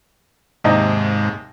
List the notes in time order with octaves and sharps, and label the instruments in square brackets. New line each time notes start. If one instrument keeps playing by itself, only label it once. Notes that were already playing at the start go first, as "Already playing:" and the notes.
[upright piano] D#2 C3 D#4 [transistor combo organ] G#2